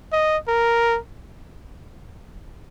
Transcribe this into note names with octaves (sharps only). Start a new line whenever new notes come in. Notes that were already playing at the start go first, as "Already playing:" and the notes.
D#5
A#4